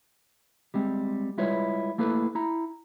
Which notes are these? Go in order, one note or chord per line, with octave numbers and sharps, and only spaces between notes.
G3 G#3 C4
G3 G#3 E4 F4 B4 C#5
A3 A#3 E4 A4 B4
E4 A#5